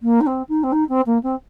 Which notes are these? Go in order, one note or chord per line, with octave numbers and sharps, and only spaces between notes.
A#3
D#4
C4
D#4
C4
D#4
C4
A#3
C4